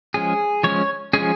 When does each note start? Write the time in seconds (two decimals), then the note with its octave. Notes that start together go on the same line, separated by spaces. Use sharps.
0.14 F3 G#3 C#4 G#4
0.63 F3 G#3 C#4 C#5
1.13 F3 G#3 C#4 G#4